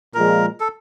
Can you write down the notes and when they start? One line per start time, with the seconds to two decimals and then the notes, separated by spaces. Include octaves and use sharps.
0.14 A#2 F3 G#3 A#4
0.60 A4